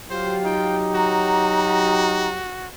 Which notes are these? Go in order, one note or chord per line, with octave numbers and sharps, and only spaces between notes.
F#3 F4 G4 C5
D#4 G5
F#4 A#5